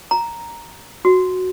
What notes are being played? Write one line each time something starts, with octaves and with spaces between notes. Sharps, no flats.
A#5
F#4